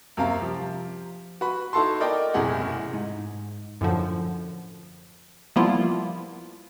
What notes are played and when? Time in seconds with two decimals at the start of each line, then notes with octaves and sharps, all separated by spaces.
0.17 F#2 C3 A#3 F5 A#5
0.41 F3 G4
1.41 F#4 B4 B5
1.73 D#4 E4 F#4 A4 A5 C6
2.00 A#4 D5 D#5 G5 D6
2.34 E1 F#2 A2 C3 G#4 F#5
2.93 G#2 D#4
3.81 F#2 A2 D3 F3
5.56 F3 G3 A#3 B3 E4 F4